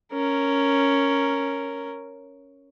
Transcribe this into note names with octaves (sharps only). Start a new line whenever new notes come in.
C#4 A#4